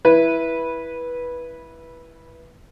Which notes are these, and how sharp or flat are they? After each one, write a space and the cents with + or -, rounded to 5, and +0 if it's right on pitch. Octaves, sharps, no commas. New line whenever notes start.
E4 +0 B4 -15